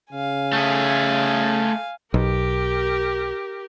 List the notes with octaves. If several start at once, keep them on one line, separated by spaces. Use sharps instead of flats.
C#3 F5 G#5
A3 G#4
B1 G4 A#4